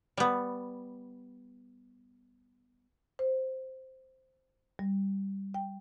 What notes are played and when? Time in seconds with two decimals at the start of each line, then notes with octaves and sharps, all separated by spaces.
0.17 G3 B3
3.19 C5
4.79 G3
5.54 G5